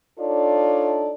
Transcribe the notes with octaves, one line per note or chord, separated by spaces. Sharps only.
D4 D#4 F4 A4 C#5 D5